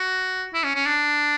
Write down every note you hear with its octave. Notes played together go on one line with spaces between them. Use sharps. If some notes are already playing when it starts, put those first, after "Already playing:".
Already playing: F#4
E4
C#4
C#4
D4